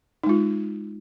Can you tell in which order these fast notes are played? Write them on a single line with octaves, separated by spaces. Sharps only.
D#4 G#3 F4